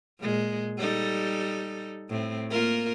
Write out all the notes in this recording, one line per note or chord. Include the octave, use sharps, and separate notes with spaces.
A#2 G#3
G3 D#4 A4
A2 C4
A#3 F4 A#4